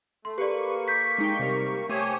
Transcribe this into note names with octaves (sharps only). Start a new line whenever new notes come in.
A3 C6
A#3 G4 A4 B4 D5 C#6
G6 B6
G#3 D#4 G5
C3 G3 A#4
A3 G4 C5 C#5 G#5 D#6